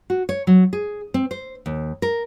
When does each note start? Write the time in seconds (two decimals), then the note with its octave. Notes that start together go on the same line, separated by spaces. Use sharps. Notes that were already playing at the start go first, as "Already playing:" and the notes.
0.10 F#4
0.29 C#5
0.47 F#3
0.73 G#4
1.14 C4
1.31 C5
1.66 D#2
2.02 A#4